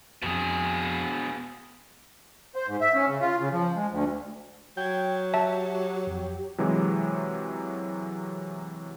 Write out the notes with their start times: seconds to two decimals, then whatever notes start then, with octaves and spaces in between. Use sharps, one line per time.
0.22 F2 B2 G#4
2.55 C5
2.67 G#2
2.81 E5
2.94 C#4
3.07 C#3
3.21 F4
3.39 C#3
3.52 F3
3.76 G#3
3.91 D2
4.77 F#3 G5 G6 G#6
5.34 G4 E5 A5
6.07 F2
6.58 C3 E3 F#3 G#3